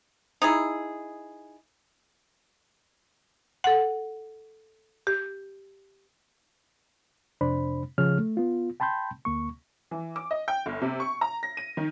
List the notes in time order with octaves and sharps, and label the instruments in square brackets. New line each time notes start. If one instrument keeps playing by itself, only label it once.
[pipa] D#4 E4 G#4
[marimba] A4 F#5
G4
[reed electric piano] F2 C3 D4 C5 B5
C#3 F3 G#4 C#5 F6
A3
B3 F4
G5 A5 B5 C6 G6
D2 A#3 C#6
[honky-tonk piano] E3
D6
D#5
G5
G1
C3
C#6
A#5
A#6
D#7
D#3